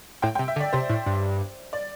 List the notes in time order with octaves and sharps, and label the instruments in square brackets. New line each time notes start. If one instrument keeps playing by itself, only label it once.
[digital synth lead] A2 [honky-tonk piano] G5
[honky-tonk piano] G5
[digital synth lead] C3
[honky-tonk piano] E5
[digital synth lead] D3
[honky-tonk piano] D5
[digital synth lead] C3 [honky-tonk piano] C5
[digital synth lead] A2
G2
[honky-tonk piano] D5